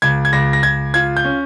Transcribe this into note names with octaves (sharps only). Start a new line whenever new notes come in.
C#2 G#6
G#6
C#2 A#6
A#6
C#2 G#6
F4 G#6
G6
C#4